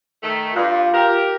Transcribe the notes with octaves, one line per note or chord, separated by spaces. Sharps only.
D#3 A3
G2 F4
G4 A#4